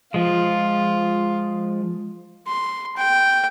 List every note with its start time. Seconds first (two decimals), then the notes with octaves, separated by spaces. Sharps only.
0.14 F3 G#3 F4
2.47 C6
2.97 G5